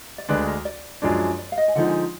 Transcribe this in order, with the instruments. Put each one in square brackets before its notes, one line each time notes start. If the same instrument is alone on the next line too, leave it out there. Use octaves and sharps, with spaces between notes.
[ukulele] D5
[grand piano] D2 D3 G#3 D4 [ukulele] B4
[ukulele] A#4
D5
[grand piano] F#2 F3 G#3 D4
[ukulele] D5
F5
D#5
G#5
[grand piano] D3 F3 G#3 D#4 [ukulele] F#5
[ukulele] G#5